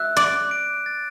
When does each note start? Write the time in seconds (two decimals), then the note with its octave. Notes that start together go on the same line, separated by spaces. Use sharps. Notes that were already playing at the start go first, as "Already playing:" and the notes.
Already playing: E5 F#6
0.17 D5 D6
0.51 D7
0.86 A6